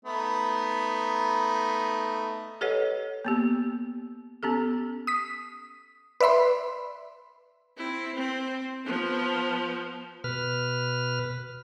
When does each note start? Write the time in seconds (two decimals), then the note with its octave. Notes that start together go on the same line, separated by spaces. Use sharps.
0.05 A3 B3 D#4
2.61 G4 A4 B4 C#5 D#5 F#5
3.25 A#3 B3 G4
4.43 B3 C#4 G4 A4
5.07 D#6 B6
6.20 B4 D5 E5 B5 C6
7.77 C4 E4
8.15 C4
8.85 F3 B3
10.24 B2 B4 F6